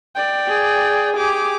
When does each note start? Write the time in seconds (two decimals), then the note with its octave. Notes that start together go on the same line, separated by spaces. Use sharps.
0.15 D5 G5
0.48 G#4
1.17 G4 G#4 D6